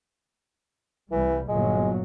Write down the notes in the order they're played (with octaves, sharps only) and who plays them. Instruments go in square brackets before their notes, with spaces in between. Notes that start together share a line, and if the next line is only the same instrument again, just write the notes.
[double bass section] C2 G3 [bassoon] E3
[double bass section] G1 A#2 F#3 [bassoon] G#3